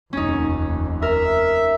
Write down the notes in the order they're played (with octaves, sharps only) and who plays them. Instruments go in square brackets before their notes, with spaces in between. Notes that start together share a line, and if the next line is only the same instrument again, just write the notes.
[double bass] F1 D#2 [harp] C#4 D#4
[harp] A#4 [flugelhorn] E5